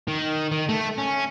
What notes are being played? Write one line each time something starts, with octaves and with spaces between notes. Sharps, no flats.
D#3
D#3
A3
C#4